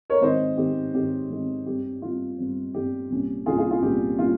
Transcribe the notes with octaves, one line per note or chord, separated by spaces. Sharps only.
A#4 C#5
G#2 D#3 G#3 C4 C5 D#5
G#2 D#3 G#3 C4 G4
G#2 D#3 G#3 C4 G4
G#2 D#3 G#3 C4
G2 G3 C4 G4
G2 G3 C4 F4
G2 G3 C4
G2 G3 C4 G4
C2 A#2 G3 C#4
C2 A#2 G3 C#4 F4 G#4
F4 G#4
F4 G#4
C2 A#2 G3 C#4 G4
A#2 G3 C#4 F4